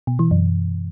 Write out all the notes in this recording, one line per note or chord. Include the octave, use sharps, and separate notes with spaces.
B2
E3
F#2